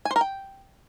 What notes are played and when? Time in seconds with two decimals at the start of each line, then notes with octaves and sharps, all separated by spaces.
0.05 G#5
0.11 C5
0.16 A#4
0.21 G5